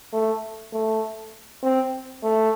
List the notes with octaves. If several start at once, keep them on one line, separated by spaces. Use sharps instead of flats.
A3
A3
C4
A3